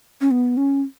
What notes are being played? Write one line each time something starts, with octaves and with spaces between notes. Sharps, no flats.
C#4
B3
C#4